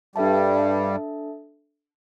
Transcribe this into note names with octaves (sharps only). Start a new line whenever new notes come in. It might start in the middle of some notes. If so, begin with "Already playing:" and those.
G2 G3 D4 A4 E5 A5